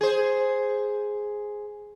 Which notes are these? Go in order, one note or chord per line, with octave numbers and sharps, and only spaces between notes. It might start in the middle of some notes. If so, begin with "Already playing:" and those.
G#4 C5